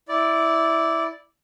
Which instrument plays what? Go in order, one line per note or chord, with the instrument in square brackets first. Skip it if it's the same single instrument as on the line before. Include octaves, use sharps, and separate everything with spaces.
[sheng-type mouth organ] E4 D5